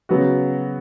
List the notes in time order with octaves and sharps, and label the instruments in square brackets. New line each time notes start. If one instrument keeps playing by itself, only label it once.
[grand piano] C#3 F#3 B3 F#4